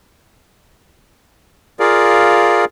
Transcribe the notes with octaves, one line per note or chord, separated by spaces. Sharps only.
F4 G#4 A#4 D5 F5